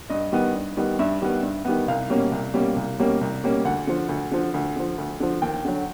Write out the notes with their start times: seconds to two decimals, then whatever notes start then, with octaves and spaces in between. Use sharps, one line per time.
0.10 G2 D#5
0.32 D#3 G3 B3
0.55 G2
0.77 D#3 G3 B3
0.99 G2 E5
1.22 D#3 G3 B3
1.43 G2
1.65 D#3 G3 B3
1.88 C2 F5
2.10 B2 G3 A#3 C#4
2.32 C2
2.54 B2 G3 A#3 C#4
2.76 C2
2.99 B2 G3 A#3 C#4
3.21 C2
3.43 B2 G3 A#3 C#4
3.65 D2 F#5
3.87 D3 F3
4.09 D2
4.31 D3 F3
4.54 D2
4.76 D3 F3
4.98 D2
5.20 D3 F3
5.42 D#2 G5
5.65 D3 F#3